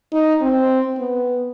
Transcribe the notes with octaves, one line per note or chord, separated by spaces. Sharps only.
D#4
C4
B3